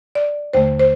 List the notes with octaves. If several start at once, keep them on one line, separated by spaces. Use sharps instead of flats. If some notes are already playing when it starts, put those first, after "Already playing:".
D5
D#2 D3 A3 C5
C5